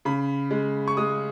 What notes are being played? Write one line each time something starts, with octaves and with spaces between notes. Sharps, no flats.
C#3 B5
G#3
C#6
G#3 D#6